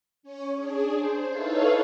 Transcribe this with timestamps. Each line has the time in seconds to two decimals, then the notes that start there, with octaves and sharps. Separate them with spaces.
0.23 C#4 C#5
0.54 D4 G#4
0.95 C5
1.32 D#4 E4 A4 B4 C#5 F5